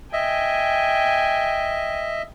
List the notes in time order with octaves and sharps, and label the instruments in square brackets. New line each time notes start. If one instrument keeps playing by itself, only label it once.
[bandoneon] D#5 E5 [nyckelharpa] G5 G#5